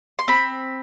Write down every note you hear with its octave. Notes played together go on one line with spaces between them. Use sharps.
C6
C4 B5